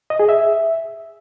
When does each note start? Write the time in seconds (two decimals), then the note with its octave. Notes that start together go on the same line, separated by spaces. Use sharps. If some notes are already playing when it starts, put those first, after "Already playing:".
0.10 D#5
0.19 G#4
0.29 E5